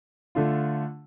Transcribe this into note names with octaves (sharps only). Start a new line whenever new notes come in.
D3 A3 D4 F4